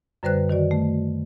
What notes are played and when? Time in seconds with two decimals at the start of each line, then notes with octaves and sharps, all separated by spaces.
0.23 F#2 D3 G3 B4 C5 F#6
0.49 D#3 F#4 D5
0.71 A3